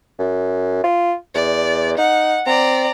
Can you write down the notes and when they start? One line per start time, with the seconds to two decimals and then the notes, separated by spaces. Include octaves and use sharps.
0.19 F#2
0.84 F4
1.35 E2 D5
1.98 D#4 F#5
2.46 C4 D5 A#5